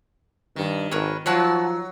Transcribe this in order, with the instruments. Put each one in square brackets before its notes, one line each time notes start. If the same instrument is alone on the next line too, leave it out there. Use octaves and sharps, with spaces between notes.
[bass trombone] G2 [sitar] D#3
[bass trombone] G#1 [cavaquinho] A#4 B4 C#5
[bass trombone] F3 [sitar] F#3 [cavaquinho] C#5 F#5 A5